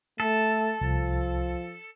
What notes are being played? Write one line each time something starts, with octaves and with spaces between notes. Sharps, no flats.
A3 A4
C2 F3